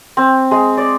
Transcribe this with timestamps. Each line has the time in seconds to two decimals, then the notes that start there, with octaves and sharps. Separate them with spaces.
0.17 C4
0.51 G#3
0.77 D5